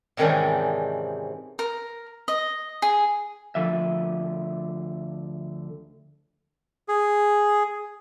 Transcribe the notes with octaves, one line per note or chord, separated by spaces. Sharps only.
G#2 C3 D#3 E3 C#4 D4
A#4
D#5
G#4
D2 D3 F3 E5
G#4